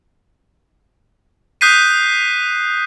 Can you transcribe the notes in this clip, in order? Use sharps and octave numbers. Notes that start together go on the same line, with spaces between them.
D#6 F#6 G6 B6 C7 D#7